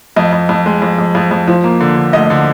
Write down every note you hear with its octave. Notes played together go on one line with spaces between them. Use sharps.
F2 D#5
F2
F2
G#3
F2
F2
F2
F2
F3
A#3
D3
D3
D2 D#5
D3